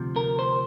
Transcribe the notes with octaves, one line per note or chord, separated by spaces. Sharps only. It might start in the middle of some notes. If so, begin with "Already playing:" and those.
Already playing: D2 C3 F3
A#4
C5